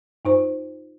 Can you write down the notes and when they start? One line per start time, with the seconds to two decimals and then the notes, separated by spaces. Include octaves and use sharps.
0.25 G2 D#4 C5